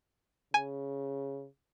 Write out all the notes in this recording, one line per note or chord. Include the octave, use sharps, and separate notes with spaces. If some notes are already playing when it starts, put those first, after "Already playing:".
C#3 G#5